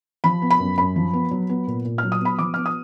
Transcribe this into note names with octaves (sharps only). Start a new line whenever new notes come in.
F3 B5
B3
B5
F#2
F#2 B5
F3
B3
F#3
B3
A#2
A#2
F#3 F6
D#6
B3 B5
F3 D6
B3 F6
D#6